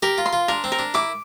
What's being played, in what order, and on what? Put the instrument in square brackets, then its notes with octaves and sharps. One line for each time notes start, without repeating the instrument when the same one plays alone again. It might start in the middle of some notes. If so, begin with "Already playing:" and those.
[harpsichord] G4 [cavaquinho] A#4
[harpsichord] F4
[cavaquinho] C6
[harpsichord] F4
[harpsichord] D4 [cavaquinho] A#4
[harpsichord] C4
[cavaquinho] A#4
[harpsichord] D4
[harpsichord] E4 [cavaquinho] D6